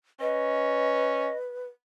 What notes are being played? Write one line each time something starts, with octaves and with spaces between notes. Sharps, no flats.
C#4 B4 D#5